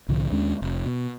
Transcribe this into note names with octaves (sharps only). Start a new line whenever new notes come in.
C2 A2 D3 F3
D#2 G#3 C#4 D4
F1
B2